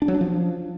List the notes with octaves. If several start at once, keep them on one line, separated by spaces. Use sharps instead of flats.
D4
F#3
D4
F3